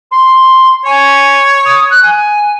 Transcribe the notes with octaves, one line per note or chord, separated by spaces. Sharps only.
C6
C#5 G#5
D#6
F#6
G#5